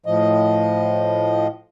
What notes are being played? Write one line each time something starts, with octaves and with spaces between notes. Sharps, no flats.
A2 F3 D#5